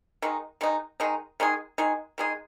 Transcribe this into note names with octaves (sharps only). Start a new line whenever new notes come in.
D#3 G#3 D#4
D#3 G#3 D#4
D#3 G#3 D#4
D#3 G#3 D#4 G#4
D#3 G#3 D#4 G#4
D#3 G#3 D#4 G#4